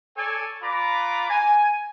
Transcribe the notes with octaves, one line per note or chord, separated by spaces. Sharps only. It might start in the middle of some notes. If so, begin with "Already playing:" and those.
A4 C#5 D5 G#5
F4 B4 D5 A#5 B5 D6
G#5